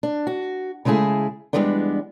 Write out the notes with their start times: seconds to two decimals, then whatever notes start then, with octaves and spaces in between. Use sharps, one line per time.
0.03 D4
0.27 F#4
0.85 C#3 G#3 A3 E4 G#4
1.53 E2 B2 G3 G#3 B3 D4